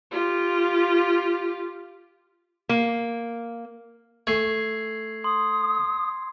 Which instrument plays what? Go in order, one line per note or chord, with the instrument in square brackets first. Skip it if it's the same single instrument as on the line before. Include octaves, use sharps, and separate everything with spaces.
[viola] F4 G4
[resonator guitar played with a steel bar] A#3
[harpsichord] A3 G#5 C#6 [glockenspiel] G#6 C7
[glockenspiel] C6 [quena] D#6